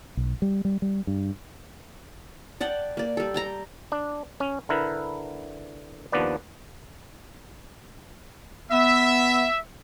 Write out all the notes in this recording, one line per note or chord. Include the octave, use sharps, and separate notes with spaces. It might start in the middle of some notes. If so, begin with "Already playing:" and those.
B1
G3
G3
G3
G2
D5 F#5 G5 A5
A#3 D5
G3 A4
G5 A5 A#5
D4
C#4
D3 E4 A#4 B4
D#2 F3 B3 D4 B4 D5
B3 E5